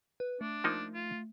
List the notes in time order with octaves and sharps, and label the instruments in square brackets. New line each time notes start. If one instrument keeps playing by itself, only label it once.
[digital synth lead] B4
[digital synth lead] A3 [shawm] D4
[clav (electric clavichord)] F3 A#3 D#4
[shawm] F4